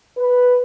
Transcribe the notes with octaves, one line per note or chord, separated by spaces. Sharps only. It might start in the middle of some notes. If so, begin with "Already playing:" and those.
B4